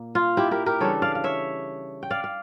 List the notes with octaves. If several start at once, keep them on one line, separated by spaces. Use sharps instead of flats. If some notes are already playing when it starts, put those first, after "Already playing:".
Already playing: A#2 A#3
F4
E4 G4
G4 A#4
G4 A#4
C#3 E3 G3 D4 A4 C#5
D5 F5
F5
C#5 E5
G5
D5 F5
F5